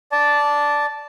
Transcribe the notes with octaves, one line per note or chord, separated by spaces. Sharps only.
D5 A5